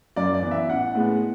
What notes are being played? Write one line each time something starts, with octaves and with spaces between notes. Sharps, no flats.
F#2 D5
D5
E3 B3
E5
A1 F#5
A2 G#3 B3